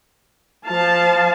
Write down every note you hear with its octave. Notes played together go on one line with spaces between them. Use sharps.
F3 F5 A5